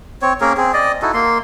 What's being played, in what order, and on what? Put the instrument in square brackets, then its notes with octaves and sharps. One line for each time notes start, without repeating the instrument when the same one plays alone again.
[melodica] C4 C#5
A#3 C#4 G#4 A#4
C4 G#4
D5 D#5
D#4 E4 F#4 A4
A#3 C6